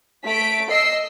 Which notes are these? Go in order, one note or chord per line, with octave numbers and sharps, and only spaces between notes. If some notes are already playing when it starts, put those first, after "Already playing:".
A3 B6 D7
D#5 E6 C7